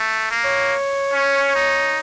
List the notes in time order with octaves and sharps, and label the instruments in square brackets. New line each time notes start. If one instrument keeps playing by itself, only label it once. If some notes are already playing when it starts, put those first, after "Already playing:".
Already playing: [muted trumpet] A3
A#3
[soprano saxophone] C#5
[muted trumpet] C#4
D#4